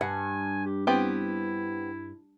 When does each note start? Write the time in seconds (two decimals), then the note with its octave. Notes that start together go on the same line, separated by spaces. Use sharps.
0.01 G2 F#5 G#5
0.65 G4
0.87 B3 C4 E4 G4